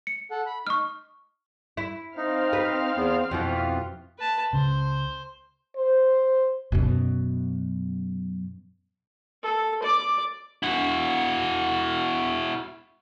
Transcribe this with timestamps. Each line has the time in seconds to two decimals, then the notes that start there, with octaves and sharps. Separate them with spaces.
0.07 C#7
0.31 A4 F#5
0.46 B5
0.67 D#4 C#6 F6
1.77 E4
2.17 C4 D#4 F5 F6
2.53 B4
2.97 E2 B3
3.31 F2 B2 E3 F4
4.19 B4 A5
4.53 C#2 C#3 C5
5.76 C5
6.72 F#2 B2
9.43 A4
9.83 D5 D6
10.63 E4 F#4